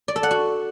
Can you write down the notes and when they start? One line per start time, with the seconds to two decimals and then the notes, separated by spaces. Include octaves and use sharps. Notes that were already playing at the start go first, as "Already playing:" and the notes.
0.08 D5
0.16 A4
0.23 F#5
0.31 F#4